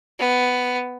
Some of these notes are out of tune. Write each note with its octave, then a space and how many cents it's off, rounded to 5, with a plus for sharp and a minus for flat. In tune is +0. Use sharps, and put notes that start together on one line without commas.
B3 +10